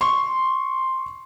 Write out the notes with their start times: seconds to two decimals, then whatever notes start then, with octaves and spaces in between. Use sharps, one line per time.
0.01 C6 C#6